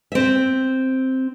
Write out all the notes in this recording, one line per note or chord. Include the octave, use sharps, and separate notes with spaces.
C4 E5